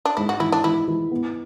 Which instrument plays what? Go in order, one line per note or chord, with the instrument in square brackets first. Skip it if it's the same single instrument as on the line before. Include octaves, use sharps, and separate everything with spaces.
[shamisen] D4
[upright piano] G#2 [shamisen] E4
[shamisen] F#4
[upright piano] E3 [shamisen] E4
[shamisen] D4
[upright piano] E3 [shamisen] E4
[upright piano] E3
B3